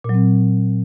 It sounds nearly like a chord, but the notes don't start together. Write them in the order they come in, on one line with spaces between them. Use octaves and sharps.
A#2 F#3 C4